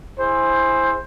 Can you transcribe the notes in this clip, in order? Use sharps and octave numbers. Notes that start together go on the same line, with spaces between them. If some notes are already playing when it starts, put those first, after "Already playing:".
E4 G#4 C5